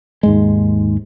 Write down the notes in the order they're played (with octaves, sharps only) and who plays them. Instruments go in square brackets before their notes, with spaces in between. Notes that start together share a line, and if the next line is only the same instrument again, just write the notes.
[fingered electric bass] D#2 G#2 G#3